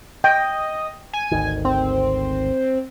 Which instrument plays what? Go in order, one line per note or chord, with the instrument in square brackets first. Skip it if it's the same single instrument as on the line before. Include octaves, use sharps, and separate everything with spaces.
[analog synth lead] D#5 [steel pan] G5
[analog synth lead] G#5
[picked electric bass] G#1 D2 D#3
[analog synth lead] C4